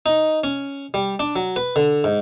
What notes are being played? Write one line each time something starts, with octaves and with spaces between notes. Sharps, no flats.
D#4
C#4
G3
D4
F#3
B4
D3
G#2